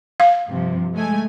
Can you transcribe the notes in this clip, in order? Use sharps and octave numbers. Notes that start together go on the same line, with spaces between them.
F5
G2 C3 F3
G#3 A3 G#5